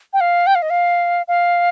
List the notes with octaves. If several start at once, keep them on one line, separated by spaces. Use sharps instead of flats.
G5
F5
G5
F5
D#5
F5
F5